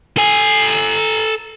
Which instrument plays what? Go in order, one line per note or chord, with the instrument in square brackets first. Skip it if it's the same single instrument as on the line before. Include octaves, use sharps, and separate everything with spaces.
[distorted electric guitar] A4 G#5